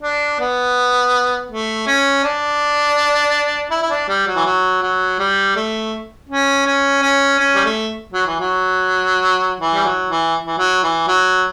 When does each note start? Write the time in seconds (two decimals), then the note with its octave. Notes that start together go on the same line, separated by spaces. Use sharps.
0.02 D4
0.40 B3
1.51 A3
1.87 C#4
2.24 D4
3.71 E4
3.82 E4
3.90 D4
4.09 G3
4.27 F#3
4.36 E3
4.45 F#3
4.82 F#3
5.19 G3
5.56 A3
6.30 C#4
6.66 C#4
7.03 C#4
7.39 C#4
7.55 G3
7.65 A3
8.13 F#3
8.26 E3
8.40 F#3
9.60 E3
9.74 G3
9.85 F#3
10.10 E3
10.46 E3
10.58 F#3
10.84 E3
11.08 F#3